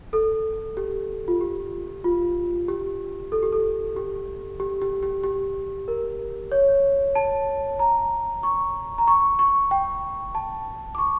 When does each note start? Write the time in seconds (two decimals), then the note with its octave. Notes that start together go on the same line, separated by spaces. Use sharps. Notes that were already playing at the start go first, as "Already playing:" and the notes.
0.13 A4
0.77 G4
1.28 F4
1.41 G4
2.04 F4
2.68 G4
3.32 A4
3.43 G4
3.53 A4
3.96 G4
4.60 G4
4.82 G4
5.03 G4
5.24 G4
5.88 A#4
6.52 C#5
7.15 A5
7.79 A#5
8.43 C#6
8.98 A#5
9.07 C#6
9.39 C#6
9.71 G5
10.35 A5
10.95 D6
10.98 C#6